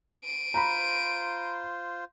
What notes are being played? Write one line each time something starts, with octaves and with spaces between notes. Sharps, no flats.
D7 D#7
F4 C5 A#5 B5